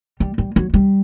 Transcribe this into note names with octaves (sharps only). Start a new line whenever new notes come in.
G3
G3
F#3
G3